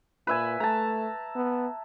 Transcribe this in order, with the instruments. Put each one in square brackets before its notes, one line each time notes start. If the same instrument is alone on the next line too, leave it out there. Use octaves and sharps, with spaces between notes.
[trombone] A#2 [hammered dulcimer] B4 E5 G#5
[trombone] A3 [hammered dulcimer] A5 A#5
[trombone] B3